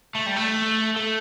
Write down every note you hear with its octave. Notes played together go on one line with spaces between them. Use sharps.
A3
G3
A3
A3